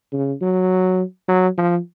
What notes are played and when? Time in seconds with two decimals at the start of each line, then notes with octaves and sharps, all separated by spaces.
0.12 C#3
0.42 F#3
1.28 F#3
1.57 F3